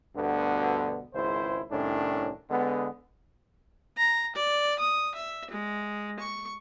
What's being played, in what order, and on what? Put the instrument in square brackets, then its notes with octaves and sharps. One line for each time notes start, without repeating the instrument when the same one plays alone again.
[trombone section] D2 G2 B2 D3 B3
G#1 C#2 E4 C5
C2 A2 D#3 C#4 D4
D3 G#3 B3
[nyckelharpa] A#5
D5
D#6
E5
G#3
C#6